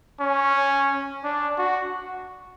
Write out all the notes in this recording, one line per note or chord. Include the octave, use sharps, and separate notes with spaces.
C#4
D4
F#4